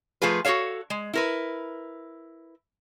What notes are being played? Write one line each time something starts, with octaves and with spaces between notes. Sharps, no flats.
F3 A3 F4 G#4 B4
F#4 G#4 A4 C#5 F5
G#3
E4 A#4 B4